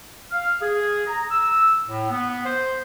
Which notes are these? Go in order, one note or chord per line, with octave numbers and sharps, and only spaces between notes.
F5
G#4
A#5
E6
A2
B3
C5